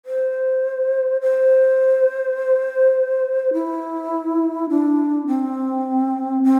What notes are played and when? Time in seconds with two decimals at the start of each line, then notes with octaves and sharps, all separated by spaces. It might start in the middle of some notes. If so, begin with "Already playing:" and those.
0.06 C5
1.21 C5
3.53 E4
4.70 D4
5.27 C4
6.44 C4